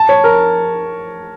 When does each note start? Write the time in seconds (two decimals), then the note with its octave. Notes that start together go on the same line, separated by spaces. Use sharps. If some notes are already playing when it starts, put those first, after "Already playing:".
Already playing: A5
0.09 C#5
0.24 A#4